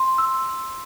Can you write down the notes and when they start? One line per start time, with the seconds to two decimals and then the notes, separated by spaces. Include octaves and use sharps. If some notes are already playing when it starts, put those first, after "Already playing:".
Already playing: C6
0.18 E6